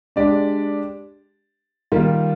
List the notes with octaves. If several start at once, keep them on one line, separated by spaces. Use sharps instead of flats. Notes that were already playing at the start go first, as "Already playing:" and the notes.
G#3 D4 G4 D5
D#3 G3 A#3 F4